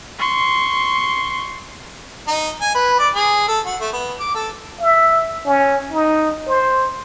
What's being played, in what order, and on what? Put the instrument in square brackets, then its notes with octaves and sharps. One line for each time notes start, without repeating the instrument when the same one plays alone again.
[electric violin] C6 C#6
[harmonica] D#4
G#5
B4
D5
G#4
A4
F#4
A3
B3
D6
A4
[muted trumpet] E5
C#4
D#4
C5